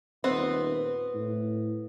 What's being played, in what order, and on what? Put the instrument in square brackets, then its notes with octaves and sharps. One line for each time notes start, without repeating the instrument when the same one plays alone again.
[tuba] D#1 [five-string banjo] B3 C4
[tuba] A2